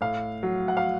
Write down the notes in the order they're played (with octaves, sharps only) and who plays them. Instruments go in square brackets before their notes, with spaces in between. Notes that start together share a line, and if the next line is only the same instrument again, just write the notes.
[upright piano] A2 F5
F#3
F#5
F5